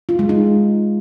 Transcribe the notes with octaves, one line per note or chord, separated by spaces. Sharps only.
F4
G#3
D#4